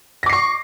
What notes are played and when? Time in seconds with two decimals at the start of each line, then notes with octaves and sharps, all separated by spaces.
0.23 A#6
0.26 D6
0.29 C7
0.33 C#6